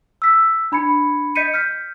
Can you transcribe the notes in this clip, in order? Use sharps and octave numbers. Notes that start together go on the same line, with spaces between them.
E6 B6
D4 B5 G#6 C#7
D#5 G6 B6 C#7 D#7
F6 G6 B6